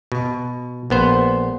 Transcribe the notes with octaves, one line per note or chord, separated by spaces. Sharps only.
B2
A#1 B3 C5